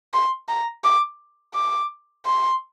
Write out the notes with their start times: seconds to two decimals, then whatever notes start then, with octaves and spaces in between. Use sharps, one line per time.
0.13 C6
0.49 A#5
0.84 D6
1.54 D6
2.26 C6